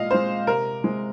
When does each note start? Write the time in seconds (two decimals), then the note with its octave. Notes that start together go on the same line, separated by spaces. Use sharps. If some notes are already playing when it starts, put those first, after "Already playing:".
Already playing: A#2 G#3 D#5 F5
0.11 G#3 C4 C5
0.47 C3 A#4
0.84 G#3 C4